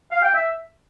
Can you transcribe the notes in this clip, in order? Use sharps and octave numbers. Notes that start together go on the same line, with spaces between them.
F5
G5
E5